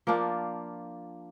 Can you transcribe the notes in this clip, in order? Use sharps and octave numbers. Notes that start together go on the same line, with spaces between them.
F3 A#3 D4 F4